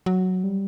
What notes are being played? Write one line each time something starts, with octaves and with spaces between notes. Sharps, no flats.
F#3
G3